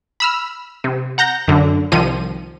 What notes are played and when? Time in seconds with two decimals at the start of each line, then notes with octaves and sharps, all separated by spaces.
0.20 B5 E6 F6
0.84 C3
1.18 F#5 A#5 G6 A#6
1.48 F#2 D3
1.92 C2 D#3 F3 D#7